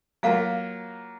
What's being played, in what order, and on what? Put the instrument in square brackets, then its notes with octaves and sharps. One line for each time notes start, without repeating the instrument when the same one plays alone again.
[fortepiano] F#3 A#3 F4 A#4 [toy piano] F5